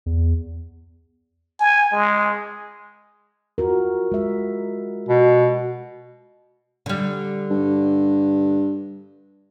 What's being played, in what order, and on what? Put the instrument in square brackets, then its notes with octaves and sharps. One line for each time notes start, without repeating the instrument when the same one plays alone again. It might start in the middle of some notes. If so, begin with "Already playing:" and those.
[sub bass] E2
[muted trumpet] G#5
G#3
[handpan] F4 F#4 A#4
G#3 E5
[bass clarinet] B2
[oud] D3 G3
[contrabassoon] G2